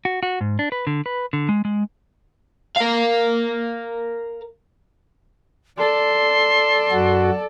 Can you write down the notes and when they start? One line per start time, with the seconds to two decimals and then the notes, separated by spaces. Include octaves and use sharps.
0.05 F#4
0.23 F#4
0.41 G#2
0.59 D4
0.72 B4
0.87 D3
1.06 B4
1.33 D3
1.49 G#3
1.65 G#3
2.76 A#4 F5
5.78 A4 D5 C6
6.92 F#2 F#4